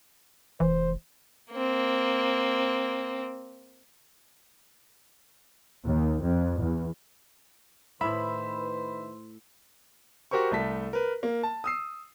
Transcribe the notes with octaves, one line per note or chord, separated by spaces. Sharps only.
F1 E3 C5
A#3 C4
D#2
F2
E2
A2 D#3 E4 B4 C5 E5 B5 E6
F#4 G4 A#4 C5 C#6
C2 A3 A5 B6
A#4 B4
A#3
A5
D#6 E6 C7